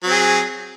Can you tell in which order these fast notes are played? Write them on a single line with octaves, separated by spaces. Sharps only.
F#3 C4 G#4